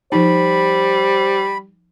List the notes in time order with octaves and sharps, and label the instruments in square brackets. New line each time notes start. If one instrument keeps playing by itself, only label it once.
[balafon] F3 D#4 [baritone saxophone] G3 [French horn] C5 [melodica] B5